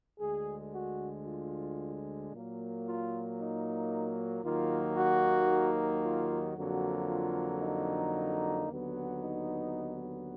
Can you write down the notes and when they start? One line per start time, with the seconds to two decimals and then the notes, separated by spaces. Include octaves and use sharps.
0.19 D2 D3 G#3 G#4
0.73 F#4
1.26 F4
2.32 A#2 F#3 A#3
2.85 F4
3.38 D#4
4.44 D#2 D#3 F#3 A#3 F4
4.97 F#4
6.04 F4
6.57 F2 D3 F#3 A#3 F#4
7.10 F4
7.62 D#4
8.69 D#2 D3 F#3 B3
9.22 D#4